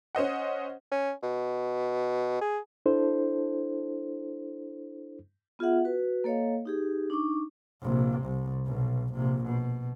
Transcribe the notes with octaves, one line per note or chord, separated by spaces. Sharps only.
C#4 C5 D#5 F#5
C#4
B2
G#4
D4 E4 A4 C5
B3 F4 G#4 E5 F#5
F#4 B4
A#3 A4 C#5 D#5 F5
D#4 G4 G#4
D4 D#4 C#6 D6
A#1 C3
C2
B1 B2
A#1 C3
B2